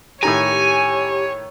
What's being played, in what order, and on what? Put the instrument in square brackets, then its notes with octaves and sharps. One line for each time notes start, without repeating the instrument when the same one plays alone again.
[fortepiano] A2 D#3 A#5 [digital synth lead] G4 [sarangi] C#5 [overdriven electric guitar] G#5